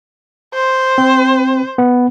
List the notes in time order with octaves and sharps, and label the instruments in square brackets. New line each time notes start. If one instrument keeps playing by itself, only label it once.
[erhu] C5
[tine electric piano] C4
B3